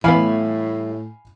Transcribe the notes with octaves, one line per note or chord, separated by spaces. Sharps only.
A2 E3 G3 A3 B3 F5 G#5 B5